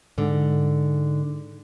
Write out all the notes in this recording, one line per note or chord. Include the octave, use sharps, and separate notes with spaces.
G#2 D3